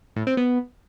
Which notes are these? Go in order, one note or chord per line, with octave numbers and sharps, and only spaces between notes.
A2
C4
B3